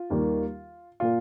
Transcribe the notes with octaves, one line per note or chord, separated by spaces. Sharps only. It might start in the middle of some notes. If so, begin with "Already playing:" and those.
Already playing: F4
D#2 D#3 G3 A#3
A#2 A#3 F4